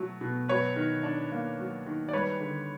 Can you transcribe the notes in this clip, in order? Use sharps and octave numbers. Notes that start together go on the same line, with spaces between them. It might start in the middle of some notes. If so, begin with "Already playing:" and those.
Already playing: B2 F#3 A3
B2
F#3 B4 C#5
D#3
D4
A#3
F#3
D#3
D5
G3 B4 C#5
D3